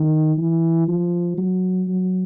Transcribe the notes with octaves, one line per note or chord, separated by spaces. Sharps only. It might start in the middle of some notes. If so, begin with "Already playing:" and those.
Already playing: D#3
E3
F3
F#3
F#3